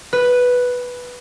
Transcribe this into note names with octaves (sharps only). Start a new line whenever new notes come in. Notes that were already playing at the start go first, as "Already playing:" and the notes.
B4